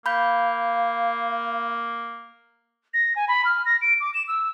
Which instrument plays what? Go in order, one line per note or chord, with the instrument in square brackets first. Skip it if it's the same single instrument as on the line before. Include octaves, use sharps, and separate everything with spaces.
[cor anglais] A#3 [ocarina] F5 [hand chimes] B5 G6
[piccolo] A#6
G#5
B5
F6
A#6
D7
D6
E7
E6